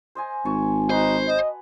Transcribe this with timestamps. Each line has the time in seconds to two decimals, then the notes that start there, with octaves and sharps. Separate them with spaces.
0.15 C5 D#5 G#5
0.45 G#1 G#5 A5 C#6
0.90 D#4 F#4 B4 C5
1.28 D#5